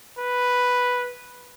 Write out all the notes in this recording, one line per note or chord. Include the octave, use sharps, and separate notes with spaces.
B4